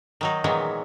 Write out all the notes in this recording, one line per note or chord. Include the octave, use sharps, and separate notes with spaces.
D#3 F#3 D#4
A#2 D#3 E3 F#3 G#3 B3